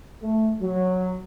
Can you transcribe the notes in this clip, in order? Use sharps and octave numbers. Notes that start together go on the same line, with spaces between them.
A3
F#3